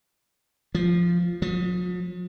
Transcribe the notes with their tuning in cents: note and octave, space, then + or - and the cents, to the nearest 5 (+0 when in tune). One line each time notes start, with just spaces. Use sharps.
F3 -5
F3 +45